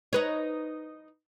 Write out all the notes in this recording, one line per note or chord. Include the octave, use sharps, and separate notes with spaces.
D#4 B4 C#5